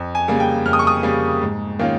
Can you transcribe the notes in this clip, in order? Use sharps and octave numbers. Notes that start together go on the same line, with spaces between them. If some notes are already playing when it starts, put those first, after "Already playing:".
Already playing: F2
G#5
C#3 G3 A#3
G5
F2 F6
D#6
C#6
D#6
C#3 G3 A#3
G#2
D#3 A#3 C#4 F4